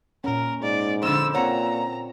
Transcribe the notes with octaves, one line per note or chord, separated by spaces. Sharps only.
A#2 C#4 A#4
G#2 D5
F2 D3 C5 E6
A#2 C4 C#5 F#5 A#5